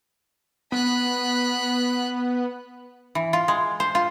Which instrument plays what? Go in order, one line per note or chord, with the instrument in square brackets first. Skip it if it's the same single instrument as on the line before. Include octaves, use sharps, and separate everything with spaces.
[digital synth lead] B3 [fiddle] B5 F#6
[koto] E3
F4
G#3
C5
F4